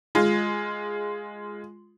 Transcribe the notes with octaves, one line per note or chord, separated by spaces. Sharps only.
G#3 F4